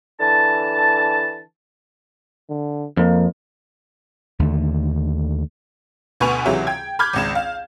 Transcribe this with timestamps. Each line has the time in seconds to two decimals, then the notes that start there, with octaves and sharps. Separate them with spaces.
0.19 D3 E3 A5
2.49 D3
2.97 F2 A#3
4.39 D#2 D3 A3
6.20 D2 B2 B4 G#5 C#6 F7
6.45 C#2 C3 E3 F#3 G#3 E5
6.67 G5 G#6
6.99 B5 D6 F6 G6 G#6
7.13 G#1 C#2 E7
7.35 F5